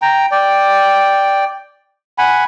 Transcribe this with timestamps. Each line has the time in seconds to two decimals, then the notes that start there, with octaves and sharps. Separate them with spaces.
0.02 G5 A#5
0.31 D5 G5
2.18 F#5 G#5 B5